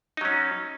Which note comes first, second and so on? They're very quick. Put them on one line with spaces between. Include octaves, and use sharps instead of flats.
D#4 F#3 C#4